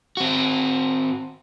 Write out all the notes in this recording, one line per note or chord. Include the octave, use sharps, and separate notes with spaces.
C4 F#4